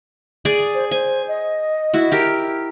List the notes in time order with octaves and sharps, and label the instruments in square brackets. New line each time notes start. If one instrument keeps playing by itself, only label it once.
[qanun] G#4 D5 G#5
[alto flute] C5
[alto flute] C5 [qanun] G#5
[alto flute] D#5
[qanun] E4 F#4
G4 A#4